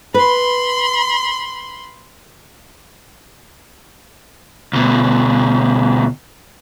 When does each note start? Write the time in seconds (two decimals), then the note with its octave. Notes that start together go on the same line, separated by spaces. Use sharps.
0.14 B4 B5 C6
4.73 D2 B2